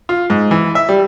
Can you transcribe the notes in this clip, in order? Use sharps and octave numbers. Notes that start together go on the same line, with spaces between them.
F4
G#2
E3
E5
G3